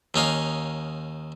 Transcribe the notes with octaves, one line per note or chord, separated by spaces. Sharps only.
D#2 C#4 D#4 F5